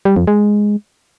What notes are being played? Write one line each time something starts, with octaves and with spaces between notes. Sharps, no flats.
G3
F2
G#3